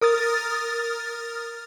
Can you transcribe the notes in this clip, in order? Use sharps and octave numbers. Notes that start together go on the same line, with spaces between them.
A#4 D#6 F6 A6